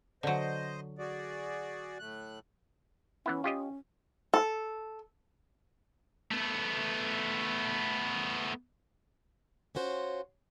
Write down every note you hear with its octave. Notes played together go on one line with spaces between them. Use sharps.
D3 F#3 C5 D#5
F#4 G#4 D5
A2 A3 F#6
E3 B3 C#4 E4
F4 G4 D#5
A4
A3 B3
C#4 F4 F#4 C5 C#5